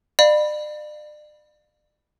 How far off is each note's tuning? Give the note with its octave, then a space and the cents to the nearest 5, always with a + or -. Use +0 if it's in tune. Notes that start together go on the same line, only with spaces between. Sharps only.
D5 +40 F5 +0 B5 -5